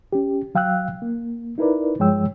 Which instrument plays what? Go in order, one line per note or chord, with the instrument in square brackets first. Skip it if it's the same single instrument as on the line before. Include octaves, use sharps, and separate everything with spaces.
[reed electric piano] C#4 G4
F#3 F5 G5 E6 F#6
A#3
D#4 E4 A#4 B4 D5
G2 F3 G#3 C#5 G5 E6